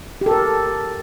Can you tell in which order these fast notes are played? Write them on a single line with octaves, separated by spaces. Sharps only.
G4 A4 A#4